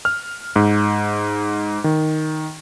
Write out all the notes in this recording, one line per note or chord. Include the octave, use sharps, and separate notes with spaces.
F6
G#2
D#3